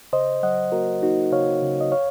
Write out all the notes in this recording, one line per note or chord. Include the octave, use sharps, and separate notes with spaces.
C#3 C5 D#5
F#3 D#5 F#5
A#3 F#4 A#4
A#3 D#4 F#4
C#3 C#5 F5
C#3
D#5
C#5 F5